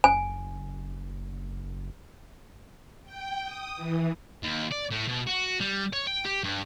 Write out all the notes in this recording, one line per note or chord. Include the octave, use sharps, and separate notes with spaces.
F#1 G#5
G5
D#6
E3
D#2
D5
A2
B2
F#4
G3
C#5
G5
G4
G2